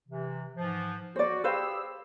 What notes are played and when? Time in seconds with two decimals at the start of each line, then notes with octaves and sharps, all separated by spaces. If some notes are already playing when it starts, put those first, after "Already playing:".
0.08 C3 E3
0.56 G#2 E3 F3
1.16 F#4 C5 D5
1.44 G4 G#4 B4 C5 F5 E6